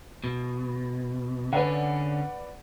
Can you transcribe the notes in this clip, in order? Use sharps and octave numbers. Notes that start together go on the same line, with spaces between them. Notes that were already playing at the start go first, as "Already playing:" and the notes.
B2
D3 C#4 B4 D5 F#5